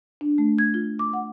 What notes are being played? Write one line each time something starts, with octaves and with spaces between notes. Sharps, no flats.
D4
A3
G#6
F4
D6
F#5